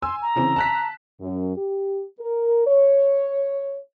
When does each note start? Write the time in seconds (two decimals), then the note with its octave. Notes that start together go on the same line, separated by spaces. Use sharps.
0.02 G#5 C6 E6
0.21 A#5
0.36 C#3 E3 C4
0.56 A5 F#6 B6
1.21 F#2
1.57 G4
2.20 A#4
2.67 C#5